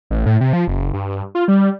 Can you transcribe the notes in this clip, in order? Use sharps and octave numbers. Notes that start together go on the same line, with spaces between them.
A1
A2
C3
F3
F#1
G2
F4
G3